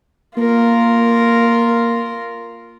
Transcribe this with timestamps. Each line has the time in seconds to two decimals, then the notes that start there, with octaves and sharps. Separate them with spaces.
0.37 A#3 F4 A#4